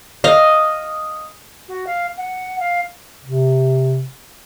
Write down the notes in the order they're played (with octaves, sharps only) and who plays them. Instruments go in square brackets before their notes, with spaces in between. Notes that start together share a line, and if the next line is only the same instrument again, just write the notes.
[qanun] D#5 F5
[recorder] F#4
F5
F#5
F5
[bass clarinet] C3